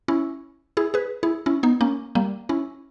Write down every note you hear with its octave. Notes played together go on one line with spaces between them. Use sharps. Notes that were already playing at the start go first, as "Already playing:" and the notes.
C#4 E4
E4 G#4
G#4 B4
E4 G#4
C#4 E4
B3 D#4
A#3 C#4
G3 A#3
C#4 E4